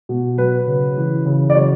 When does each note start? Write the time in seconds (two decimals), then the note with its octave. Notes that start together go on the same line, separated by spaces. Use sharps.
0.09 B2
0.38 F#3 B4
0.67 C#3
0.97 E3
1.26 C#3
1.50 D5
1.55 F#3 C#5